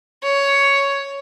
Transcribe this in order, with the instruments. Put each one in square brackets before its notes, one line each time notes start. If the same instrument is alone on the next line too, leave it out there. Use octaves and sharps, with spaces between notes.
[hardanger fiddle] C#5